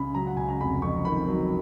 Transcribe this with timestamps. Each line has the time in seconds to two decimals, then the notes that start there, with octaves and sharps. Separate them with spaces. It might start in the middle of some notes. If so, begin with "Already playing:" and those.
Already playing: C#2 C#3 B5
0.15 F#3 A#5
0.26 F#5
0.37 C#2 G#5
0.49 A#5
0.60 F1 B5
0.82 F2 C#6
1.05 D#3 B5
1.28 F#3